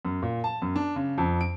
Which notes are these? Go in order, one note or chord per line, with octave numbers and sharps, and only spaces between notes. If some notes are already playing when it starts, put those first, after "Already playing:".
F#2
A#2
A5
F#2
D4
C#3
F2
D7